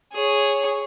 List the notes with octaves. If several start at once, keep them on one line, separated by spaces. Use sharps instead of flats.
G#4 C#5